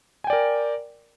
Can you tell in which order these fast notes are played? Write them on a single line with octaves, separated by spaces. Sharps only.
G#5 G5 D5 A#4